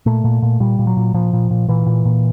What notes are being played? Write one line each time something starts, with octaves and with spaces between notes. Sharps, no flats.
A#2 A3
A#2
A#2
A#2 G3
A#2
F#3
A#2
A#2 F3
A#2
A#2
A#2 E3
A#2
A#2